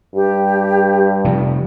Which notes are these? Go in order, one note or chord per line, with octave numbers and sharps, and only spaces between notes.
G2 G4
C3 F3